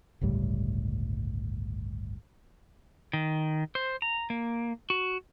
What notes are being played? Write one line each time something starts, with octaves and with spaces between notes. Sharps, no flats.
G1 C#2 A2 G3
D#3
C5
A#5
A#3
F#4